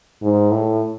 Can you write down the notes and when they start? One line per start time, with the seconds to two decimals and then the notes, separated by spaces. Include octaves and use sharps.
0.22 G#2
0.52 A2